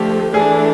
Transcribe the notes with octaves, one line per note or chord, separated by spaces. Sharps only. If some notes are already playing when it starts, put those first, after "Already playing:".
Already playing: D3 F3 A3 G4
E3 A3 D4 G#4